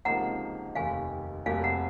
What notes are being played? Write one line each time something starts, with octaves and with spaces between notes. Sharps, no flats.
C#2 C3 F3 A#3 D#4 F#5 A#5
F1 D#2 D#3 F5 G#5
F1 F2 C3 F#3 A#3 F5 G#5
F#5 A#5